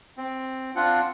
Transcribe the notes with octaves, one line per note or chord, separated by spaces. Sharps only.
C4
C4 D4 F4 F#5